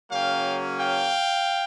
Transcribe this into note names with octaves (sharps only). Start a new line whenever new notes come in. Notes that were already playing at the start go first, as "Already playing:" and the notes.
C#3 F#3 A#3 C#4 F5 G5
F5 G5